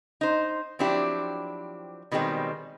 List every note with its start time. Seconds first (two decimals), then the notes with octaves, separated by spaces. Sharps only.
0.21 D#4 C5
0.79 F3 F#3 C4 D4 E4 G4
2.12 B2 D#3 G3 G#3 C4